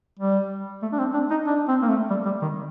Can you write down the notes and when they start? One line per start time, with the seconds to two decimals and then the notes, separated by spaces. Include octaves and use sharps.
0.19 G3
0.82 A3
0.92 D4
0.98 C4
1.14 D4
1.31 D#4
1.47 D4
1.68 C4
1.82 A#3
1.88 A3
2.10 G3
2.25 G3
2.42 D#3